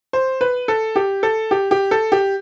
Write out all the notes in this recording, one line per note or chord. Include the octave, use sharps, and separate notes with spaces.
C5
B4
A4
G4
A4
G4
G4
A4
G4